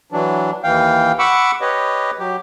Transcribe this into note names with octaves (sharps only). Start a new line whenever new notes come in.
E3 F#3 D4
D#2 E3 F5 G5
F#5 B5 C#6 D6 E6
G4 B4 C#5 D#5
F#3 G4